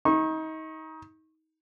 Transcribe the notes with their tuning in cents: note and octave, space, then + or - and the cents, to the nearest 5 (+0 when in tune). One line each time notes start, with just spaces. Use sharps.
D#4 +30 C#6 -30